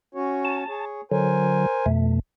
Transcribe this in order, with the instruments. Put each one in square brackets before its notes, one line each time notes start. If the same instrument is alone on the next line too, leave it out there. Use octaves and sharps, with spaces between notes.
[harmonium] C#4 F#4 C#5
[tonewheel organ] A5
[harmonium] G#4 C#5
[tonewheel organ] D3 F#3 [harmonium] A#4 C5 G#5
[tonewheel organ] F2 B2 A3